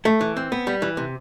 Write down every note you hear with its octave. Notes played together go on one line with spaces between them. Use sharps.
A3
E3
C4
B3
G3
E3
C3